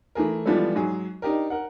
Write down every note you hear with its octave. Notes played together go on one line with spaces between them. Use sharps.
E3 A3 G#4 A#4
E3 F3 G3 G#3 B3 A4
G#2 F#3 G#4
D4 D#4 G4 A#4
A#4 F#5